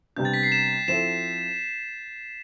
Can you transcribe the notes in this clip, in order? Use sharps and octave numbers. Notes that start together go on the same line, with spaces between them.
C3 G3 B3 D4 G6
A6
B6
C7
E7
F3 C4 E4 A4 E7